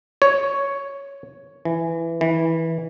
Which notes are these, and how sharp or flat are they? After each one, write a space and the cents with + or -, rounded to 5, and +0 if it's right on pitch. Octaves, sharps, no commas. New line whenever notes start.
C#5 +5
E3 +10
E3 -15